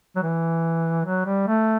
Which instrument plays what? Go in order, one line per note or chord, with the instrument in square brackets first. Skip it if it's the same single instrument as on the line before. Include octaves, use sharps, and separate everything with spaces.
[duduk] F#3
E3
F#3
G3
A3